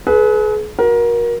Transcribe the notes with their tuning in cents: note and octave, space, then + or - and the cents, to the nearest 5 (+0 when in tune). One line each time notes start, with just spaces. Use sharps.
G#4 +40 B4 -5
F#4 -15 A#4 +25